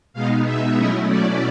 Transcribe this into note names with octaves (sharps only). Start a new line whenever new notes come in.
B2 G#3 B3 D#4 F5
E5
B2 F#3 A3 C#4 E4 D#5
D5